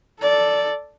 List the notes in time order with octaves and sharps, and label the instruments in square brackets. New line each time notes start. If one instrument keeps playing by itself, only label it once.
[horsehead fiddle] A4 D5